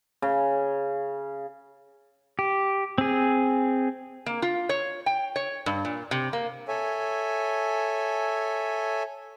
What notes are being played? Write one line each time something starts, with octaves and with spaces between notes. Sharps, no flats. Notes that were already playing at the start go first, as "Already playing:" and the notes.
C#3
G4
C4 G#4
A#3
F4
C#5
G5
C#5
G2
A#2
C3
A#3
A4 C#5 E5 G#5